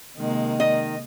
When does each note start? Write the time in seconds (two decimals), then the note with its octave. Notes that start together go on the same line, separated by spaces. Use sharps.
0.17 C3 D#3 G#3 A#3
0.60 D#5